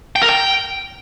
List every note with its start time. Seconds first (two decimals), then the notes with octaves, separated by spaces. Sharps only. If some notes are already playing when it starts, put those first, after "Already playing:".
0.16 G5
0.22 A#4
0.29 G5